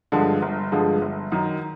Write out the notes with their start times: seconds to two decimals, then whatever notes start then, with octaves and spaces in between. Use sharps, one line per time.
0.12 G2 D3 F3 G#3
0.42 G1
0.72 G2 D3 F3 G#3
1.02 G1
1.32 F#2 D#3